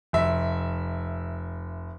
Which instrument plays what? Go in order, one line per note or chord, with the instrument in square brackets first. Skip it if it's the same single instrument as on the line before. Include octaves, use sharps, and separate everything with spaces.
[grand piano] F1 E5